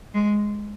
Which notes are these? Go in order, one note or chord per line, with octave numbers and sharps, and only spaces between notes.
G#3